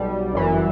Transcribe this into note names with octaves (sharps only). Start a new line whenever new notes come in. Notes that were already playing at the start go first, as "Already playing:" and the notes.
Already playing: B1 B2 G3
G1 F#2 E3